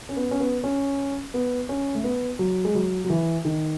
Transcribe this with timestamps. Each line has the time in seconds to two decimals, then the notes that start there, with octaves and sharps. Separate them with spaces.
0.09 C#4
0.17 B3
0.31 C#4
0.40 B3
0.64 C#4
1.34 B3
1.69 C#4
1.95 A3
2.04 B3
2.39 F#3
2.65 G#3
2.75 F#3
3.04 F#3
3.10 E3
3.45 D#3